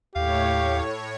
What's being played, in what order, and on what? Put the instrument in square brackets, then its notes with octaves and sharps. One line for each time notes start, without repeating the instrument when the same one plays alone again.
[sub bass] D#2 [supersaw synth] A2 C#5 [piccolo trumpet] G4 [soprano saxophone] F5